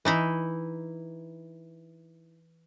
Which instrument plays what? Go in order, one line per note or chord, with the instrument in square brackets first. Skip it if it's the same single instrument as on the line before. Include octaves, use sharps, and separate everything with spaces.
[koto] E3 D#4 E4